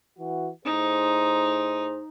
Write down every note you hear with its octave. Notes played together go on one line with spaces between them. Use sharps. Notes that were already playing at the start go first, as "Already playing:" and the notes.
E3 F#4
A2 D#4 G#4 C5